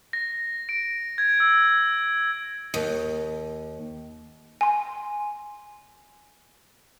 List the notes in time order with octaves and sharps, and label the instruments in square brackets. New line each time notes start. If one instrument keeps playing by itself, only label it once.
[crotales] A#6
D7
G#6
E6
[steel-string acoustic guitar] D#2
[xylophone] G#5 C6